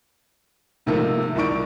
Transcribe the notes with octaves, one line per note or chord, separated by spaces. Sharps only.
G#2 C3 D#3 F3 A3 A#3
C2 D#3 E4 D5 C#6 D7